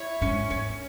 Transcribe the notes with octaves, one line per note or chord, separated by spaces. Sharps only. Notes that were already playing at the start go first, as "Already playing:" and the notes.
Already playing: E4 C#5
G#2 C#4
E2 C#4